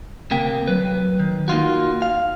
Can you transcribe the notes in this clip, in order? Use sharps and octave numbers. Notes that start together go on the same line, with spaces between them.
D2 C3 A#3 G5
F#3 B4
D#3
A#3 D#4 F4 F#4
F5